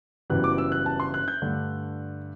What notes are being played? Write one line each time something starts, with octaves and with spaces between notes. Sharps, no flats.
F#1 F#2 E3 G3 B3 F#6
D6
E6
F#6
A5
C6
F#6
G6
G2 D3 A3